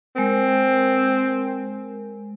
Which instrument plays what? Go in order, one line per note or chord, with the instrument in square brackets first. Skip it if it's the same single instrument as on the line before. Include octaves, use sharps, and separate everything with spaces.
[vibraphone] G#3 A#4 [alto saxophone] C4